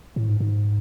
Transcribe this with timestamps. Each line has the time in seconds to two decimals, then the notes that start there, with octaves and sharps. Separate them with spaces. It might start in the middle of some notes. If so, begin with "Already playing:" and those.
0.16 A2
0.28 G#2
0.40 G#2